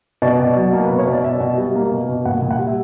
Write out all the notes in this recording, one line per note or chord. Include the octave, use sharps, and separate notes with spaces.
B2 D5
B2
F#3
A#3
B2 B4
C#5
B2 D5
B2 E5
B2
G3
A#3
B2
B2
A#2 F#5
A#2
F#5
G3
E5